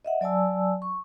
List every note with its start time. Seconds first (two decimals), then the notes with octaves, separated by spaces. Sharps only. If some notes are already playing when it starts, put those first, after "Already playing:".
0.05 D#5 E5 F#5
0.21 F#3 D5 G#5 A5 E6
0.82 C#6